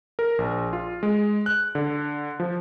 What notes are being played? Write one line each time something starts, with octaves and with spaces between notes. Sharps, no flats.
A#4
A#1
F4
G#3
F#6
D3
F3